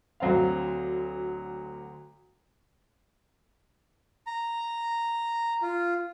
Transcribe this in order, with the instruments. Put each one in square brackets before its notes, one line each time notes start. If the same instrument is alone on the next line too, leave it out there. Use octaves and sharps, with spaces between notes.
[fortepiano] D2 F#3 C4 F5
[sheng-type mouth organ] A#5
F4